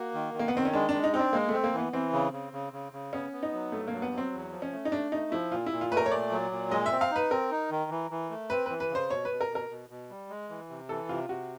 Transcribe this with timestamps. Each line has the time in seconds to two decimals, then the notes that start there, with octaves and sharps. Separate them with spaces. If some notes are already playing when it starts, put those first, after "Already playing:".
Already playing: A#3 F#4
0.14 D#3
0.34 D#3
0.39 A#3
0.48 B3
0.54 D#3 C4
0.65 C#4
0.73 G#3 D4
0.89 D4
0.94 G#3
1.04 D#4
1.14 C4 D#4
1.19 D4
1.33 G#3 A#3
1.49 A3 C4
1.64 A#3
1.74 E3 B3
1.93 E3 C4
2.13 C#3
2.33 C#3
2.53 C#3
2.73 C#3
2.93 C#3
3.13 B3 C#4
3.32 B3
3.43 D#4
3.52 F#3
3.72 G2 A3
3.88 F#3 A#3
4.02 B3
4.13 F#3
4.18 C4
4.33 E2
4.52 F3
4.62 C#4
4.72 A3
4.85 D#4
4.92 A3 D4
5.12 A3 D#4
5.32 F3 E4
5.51 A#2 F4
5.66 A#2 E4
5.81 F4
5.91 A3 B4
5.97 A#4
6.06 C#5
6.11 A#2 D5
6.31 F#3
6.51 A#2
6.71 G#3 D#5
6.86 E5
6.91 C4
7.01 F5
7.11 D#4 B4
7.31 C4 A#4
7.51 D#4
7.71 D#3
7.91 E3
8.11 E3
8.30 A3
8.50 C4 B4
8.66 E3 B4
8.80 B4
8.90 C#3 C5
9.10 B2 C#5
9.25 B4
9.30 B2
9.41 A#4
9.50 B2
9.55 A#4
9.70 B2
9.90 B2
10.10 G3
10.30 G#3
10.49 E3
10.69 C3
10.89 E3 A4
11.09 C3 F4
11.29 C3 F#4